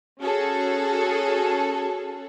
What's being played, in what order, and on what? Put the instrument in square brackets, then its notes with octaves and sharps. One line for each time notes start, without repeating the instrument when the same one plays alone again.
[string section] C#4 F#4 G#4 A4